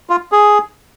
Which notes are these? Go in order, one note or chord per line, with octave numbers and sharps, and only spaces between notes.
F4
G#4